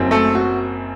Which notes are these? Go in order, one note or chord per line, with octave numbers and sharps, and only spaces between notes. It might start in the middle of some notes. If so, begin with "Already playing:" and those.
Already playing: F#1 F#2 F#3 C4
A3 A4
F#4